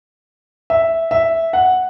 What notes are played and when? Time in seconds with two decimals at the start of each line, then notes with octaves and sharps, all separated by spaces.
0.70 E5
1.11 E5
1.53 F#5